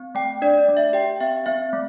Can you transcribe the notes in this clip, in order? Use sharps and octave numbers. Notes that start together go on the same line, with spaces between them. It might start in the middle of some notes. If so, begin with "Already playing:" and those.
Already playing: C4
A3 G5
D4 D5
D5
A3
E5
G4 G5
C4 E5
C4 E5
A3